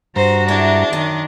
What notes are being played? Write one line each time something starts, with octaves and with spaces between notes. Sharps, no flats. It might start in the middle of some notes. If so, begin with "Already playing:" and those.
G2 F#4 C5 A#5
G#3 D4 E4 C5
F#2 D#3 D#5